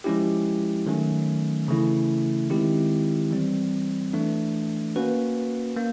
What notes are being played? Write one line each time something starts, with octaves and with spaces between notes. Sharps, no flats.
F3 G#3 C#4 E4 G4
D#3 F#3 A3 C#4
C#3 E3 A3 C#4 E4
D#3 G#3 C4 E4 G4
E3 G3 C4
E3 A3 D4
A#3 C#4 F#4 B4
A#3